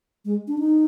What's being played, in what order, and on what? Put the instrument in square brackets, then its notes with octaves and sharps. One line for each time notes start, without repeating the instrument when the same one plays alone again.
[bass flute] G#3
D4
D#4